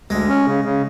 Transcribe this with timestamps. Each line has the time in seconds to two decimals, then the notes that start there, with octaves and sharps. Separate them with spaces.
0.10 D2 G#3
0.29 C#4
0.46 C#3
0.65 C#3